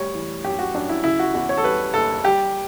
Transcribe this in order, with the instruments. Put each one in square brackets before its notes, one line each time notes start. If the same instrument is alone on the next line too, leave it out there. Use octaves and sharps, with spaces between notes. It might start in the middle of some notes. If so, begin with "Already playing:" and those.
Already playing: [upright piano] D2 G3 C#5
E3
F#2 G4
F#4
F#2 D4
E4
C#3 E4
F#4
E2 F#4
C#5
A4
G3 B4
F#1 A4
G3 G4